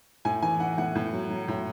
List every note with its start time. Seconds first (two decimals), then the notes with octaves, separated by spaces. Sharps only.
0.25 A2 G#5
0.42 E3 G#5
0.60 E3 F#5
0.78 A2 F#5
0.95 A2
1.13 F#3
1.30 F#3
1.48 A2